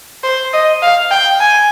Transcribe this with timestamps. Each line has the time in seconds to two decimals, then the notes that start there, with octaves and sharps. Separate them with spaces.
0.23 C5
0.53 D#5
0.82 F5
1.11 G5
1.40 G#5